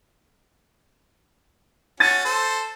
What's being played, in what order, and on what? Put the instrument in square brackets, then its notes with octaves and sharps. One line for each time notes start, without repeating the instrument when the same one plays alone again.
[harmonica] C#4 F#4 [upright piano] A6 D#7
[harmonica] A4 C5